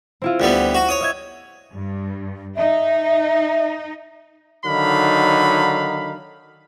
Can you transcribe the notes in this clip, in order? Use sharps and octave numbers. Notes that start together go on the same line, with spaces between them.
C4 E4 F4
D2 G3 B3 F#6
F#4
C#5 D#6
D#5 E5 G#6
G2
D#4 E5
D3 D#3 F#3 D#4 F5 B5